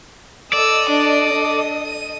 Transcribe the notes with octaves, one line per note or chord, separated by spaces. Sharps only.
A4 D5 D#5 D#6 E6
D4
D4
D#7